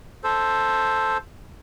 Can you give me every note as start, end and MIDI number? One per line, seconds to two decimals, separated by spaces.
0.24 1.17 69
0.24 1.17 72